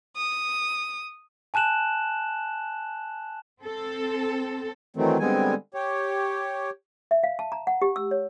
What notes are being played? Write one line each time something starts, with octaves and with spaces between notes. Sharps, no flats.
D#6
G#5 A5 F#6 E7 F#7
C4 A4
D#3 E3 F#3 A3 C4
D3 G3 G#3 B3 C4 G#5
G4 C#5
E5
F5
A5
A#5
F#5
G4
E6
C#5